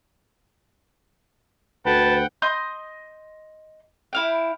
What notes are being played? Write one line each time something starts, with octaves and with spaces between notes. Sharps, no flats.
D2 B4 F#5 G5 A5
D#5 C6 D#6 G6
E4 F5 G5